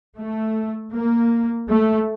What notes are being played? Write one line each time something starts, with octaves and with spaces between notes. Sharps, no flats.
A3
A#3
A3